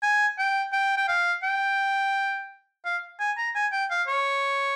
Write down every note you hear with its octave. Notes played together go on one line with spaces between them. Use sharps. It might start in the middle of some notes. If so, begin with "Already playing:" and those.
G#5
G5
G5
G5
F5
G5
F5
G#5
A#5
G#5
G5
F5
C#5